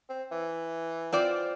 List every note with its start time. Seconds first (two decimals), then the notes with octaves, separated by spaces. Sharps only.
0.10 C4
0.31 E3
1.12 C4 F4 D5